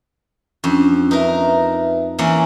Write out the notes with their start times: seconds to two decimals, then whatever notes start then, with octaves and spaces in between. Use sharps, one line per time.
0.64 F2 C#4 D4
1.11 D#4 A#4 B4 E5
2.19 E3 A#3 C#4